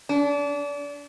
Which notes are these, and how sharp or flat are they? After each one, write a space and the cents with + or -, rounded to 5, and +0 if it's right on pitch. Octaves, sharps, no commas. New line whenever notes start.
D4 -30